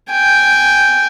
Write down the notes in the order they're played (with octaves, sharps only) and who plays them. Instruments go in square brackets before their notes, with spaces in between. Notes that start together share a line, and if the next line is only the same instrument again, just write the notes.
[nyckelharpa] G5 G#5